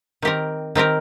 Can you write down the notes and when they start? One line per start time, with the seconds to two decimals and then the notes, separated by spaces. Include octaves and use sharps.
0.22 D#3 C4 G4 A#4
0.75 D#3 C4 G4 A#4